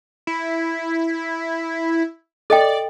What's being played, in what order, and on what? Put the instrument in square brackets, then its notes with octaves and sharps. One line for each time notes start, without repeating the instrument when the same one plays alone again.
[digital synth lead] E4
[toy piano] A4 D#5 G5 [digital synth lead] D5